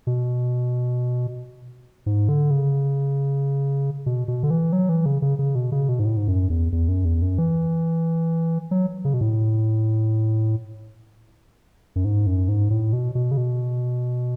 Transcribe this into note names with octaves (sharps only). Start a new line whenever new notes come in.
B2
G#2
D3
C#3
B2
B2
D3
E3
F#3
E3
C#3
C#3
C#3
B2
C#3
B2
G#2
A2
G#2
F#2
E2
E2
F#2
E2
F#2
E3
F#3
C#3
B2
A2
F#2
G#2
F#2
G#2
A2
B2
B2
C#3
B2